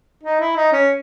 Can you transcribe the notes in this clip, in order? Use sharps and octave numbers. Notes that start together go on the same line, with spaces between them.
D#4
E4
D#4
C#4